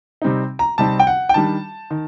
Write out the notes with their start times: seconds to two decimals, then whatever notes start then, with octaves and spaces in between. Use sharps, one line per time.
0.22 C3 G3 C4 D#4
0.59 A#5
0.78 C3 G3 C4 D#4 A5
0.99 G5
1.07 F#5
1.29 G5
1.34 D#3 G3 D4 A5
1.91 D#3